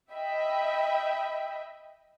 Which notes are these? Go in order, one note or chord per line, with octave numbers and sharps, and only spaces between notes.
D#5 E5 G5 B5